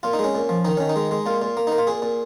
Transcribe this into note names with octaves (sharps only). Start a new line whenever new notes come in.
A#2 F4
D#4
G#3
C#4
A#2
F3
D#3 D#4
D#3 C#4
D#4
G#3
G#3
A#2 F4
A#2
A#3
A#3 D#4
F4
A#2 G#4
A#2